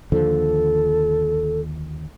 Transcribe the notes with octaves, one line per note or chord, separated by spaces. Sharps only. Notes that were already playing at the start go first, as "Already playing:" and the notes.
D#2 D3 F3 A4